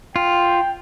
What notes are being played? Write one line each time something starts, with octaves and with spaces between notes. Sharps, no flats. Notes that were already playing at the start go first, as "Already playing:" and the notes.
F4 G5